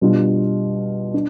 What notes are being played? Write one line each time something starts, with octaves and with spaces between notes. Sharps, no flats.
B2 G3 D4 F4
D4